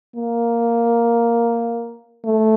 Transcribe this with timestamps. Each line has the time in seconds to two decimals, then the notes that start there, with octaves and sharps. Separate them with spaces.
0.16 A#3
2.24 A3